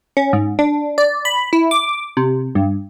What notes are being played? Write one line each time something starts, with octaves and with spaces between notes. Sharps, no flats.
C#4
G#2
D4
D5
B5
E4
D6
C3
G2